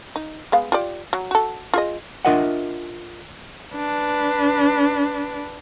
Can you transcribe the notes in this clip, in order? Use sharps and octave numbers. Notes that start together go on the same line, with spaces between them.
D#4
G#3 B3 F5
F4 G4 D5
F#3
F#4 A4
F4 G#4 D#5
D4 F4 A#4 D#5 E5 F#5
D4 B4